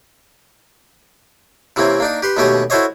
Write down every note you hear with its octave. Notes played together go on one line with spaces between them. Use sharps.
C3 E3 A#3 C4 C#4
A#3 D4 D#4
G4 B4 C6
D#2 B2 A3 C#4 G4 D#5
E4 F#4 A4 C5 C#5 D#5